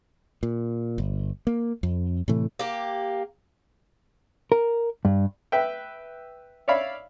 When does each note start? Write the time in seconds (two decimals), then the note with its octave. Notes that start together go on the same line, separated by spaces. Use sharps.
0.43 A#2
0.98 G1
1.47 A#3
1.83 F2
2.28 A2 C3 E3 A3
2.59 A#3 G4
4.52 A#4
5.05 G2
5.52 B4 E5 G5
6.68 C#5 D5 E5 F5 B5